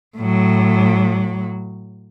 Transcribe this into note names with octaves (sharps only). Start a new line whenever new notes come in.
A2 F#3